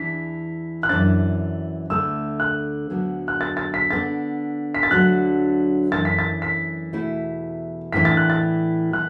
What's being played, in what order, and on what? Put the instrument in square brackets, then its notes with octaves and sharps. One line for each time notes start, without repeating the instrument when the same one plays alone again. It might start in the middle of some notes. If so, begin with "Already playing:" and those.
Already playing: [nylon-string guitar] E2 E3 D4 [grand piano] B6
[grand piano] F#6
[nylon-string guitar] F#2 E3 D4 [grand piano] A6
[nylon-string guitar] D2 D3 A3 [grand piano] E6
[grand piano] F#6
[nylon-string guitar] D2 D3 F#3 B3 D4
[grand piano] F#6
A6
A6
B6
[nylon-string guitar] D3 B3 D4 [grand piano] A6
[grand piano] B6
A6
[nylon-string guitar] D2 D3 F#3 D4 [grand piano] F#6
[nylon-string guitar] F#2 E3 A3 D4 [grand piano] A6
[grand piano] B6
A6
B6
[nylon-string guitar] E2 B2 A3 E4
[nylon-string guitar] A2 E3 D4 [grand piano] B6
[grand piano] A6
F#6
A6
[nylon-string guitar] E3 B3 [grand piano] F#6